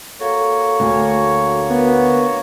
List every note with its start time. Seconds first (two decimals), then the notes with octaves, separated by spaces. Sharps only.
0.20 A#3 F#4 A4 C#5
0.80 D2
1.70 B3 A#4